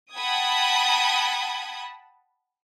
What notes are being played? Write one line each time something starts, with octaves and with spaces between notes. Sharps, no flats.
F#5 G5 A5 B5 D#6 G#6